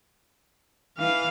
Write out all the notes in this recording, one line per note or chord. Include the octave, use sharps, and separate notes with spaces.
E3 F5